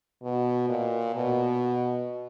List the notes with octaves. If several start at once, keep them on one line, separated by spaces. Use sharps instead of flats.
B2
A#2
B2